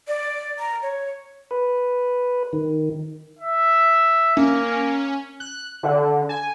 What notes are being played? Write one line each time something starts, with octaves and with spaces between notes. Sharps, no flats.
D5
A#5
C#5
B4
D#3
E5
A#3 C#4
F#6
D3
G#5